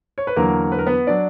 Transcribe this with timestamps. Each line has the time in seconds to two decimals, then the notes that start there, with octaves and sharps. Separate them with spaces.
0.18 C#5
0.27 B4
0.36 E2 D3 F#3 A#3 A#4
0.72 B4
0.79 A#4
0.87 B3 B4
1.07 F#3 D4 D5